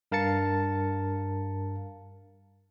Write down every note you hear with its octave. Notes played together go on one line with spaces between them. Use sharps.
G2 A#4 F5 A5 A6 C#7